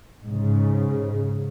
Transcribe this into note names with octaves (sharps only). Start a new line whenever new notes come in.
G#2 C#3